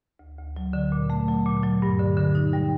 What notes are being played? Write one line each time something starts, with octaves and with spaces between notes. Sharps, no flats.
D2
D2
F#3
D3
A#2
A3
F#3
A#2
F#3
G2
D3
D3
D#4
G3